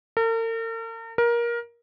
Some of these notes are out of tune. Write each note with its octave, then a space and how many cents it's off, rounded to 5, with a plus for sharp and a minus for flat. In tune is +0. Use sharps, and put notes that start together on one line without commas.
A#4 -45
A#4 +20